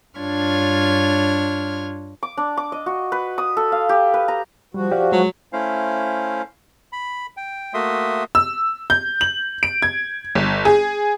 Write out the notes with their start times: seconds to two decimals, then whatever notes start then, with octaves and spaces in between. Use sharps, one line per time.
0.17 G2 D4 F4 C#5 F6 G#6
2.23 D6
2.37 D4
2.57 D6
2.72 D#5
2.86 F#4
3.12 B4
3.38 D#6
3.57 A4
3.72 F5
3.89 G4
4.14 B4
4.28 A#5
4.74 F3 G3 F#4
4.92 G4 D5 F5
5.12 F#3 G#3
5.53 A3 C#4 E4 C5 F5
6.93 B5
7.37 G5
7.74 A3 A#3 F#4 E5 C6 D#6
8.35 E6
8.90 G6
9.21 F#7
9.63 D7
9.82 G#6
10.35 G1
10.65 G#4